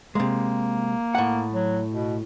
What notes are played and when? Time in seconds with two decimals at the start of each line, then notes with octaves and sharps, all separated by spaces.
0.15 C3 G#3 A#3
1.15 A2 F#5
1.53 F#3
1.92 B2